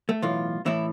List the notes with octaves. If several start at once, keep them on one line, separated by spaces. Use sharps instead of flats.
A3
B1 A2 E3 F4
A2 E3 E4